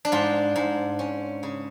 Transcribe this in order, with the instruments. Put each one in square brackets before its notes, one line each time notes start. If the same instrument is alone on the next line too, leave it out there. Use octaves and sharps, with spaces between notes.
[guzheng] D4
G#2 F4
G#2
C#4
C#3